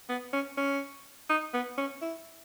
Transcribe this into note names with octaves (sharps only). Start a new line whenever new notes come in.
B3
C#4
C#4
D#4
B3
C#4
E4